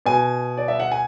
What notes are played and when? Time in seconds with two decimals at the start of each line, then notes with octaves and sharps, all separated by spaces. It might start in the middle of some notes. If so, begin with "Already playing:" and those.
0.06 B2 G#5
0.57 D5
0.68 E5
0.80 F#5
0.92 G#5